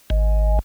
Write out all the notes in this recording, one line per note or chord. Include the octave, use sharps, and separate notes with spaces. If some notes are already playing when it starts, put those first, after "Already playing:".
G#1